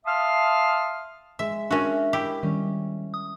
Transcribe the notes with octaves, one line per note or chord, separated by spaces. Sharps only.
E5 F5 A5 C6 D#6 F6
G#3 E5
C#4 D4 F#4 A#4 E5
E4 G4
D#3 G3 C#4
D#6